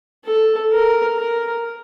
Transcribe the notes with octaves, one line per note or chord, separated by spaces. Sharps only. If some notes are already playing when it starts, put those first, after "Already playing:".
A4
A#4
A#4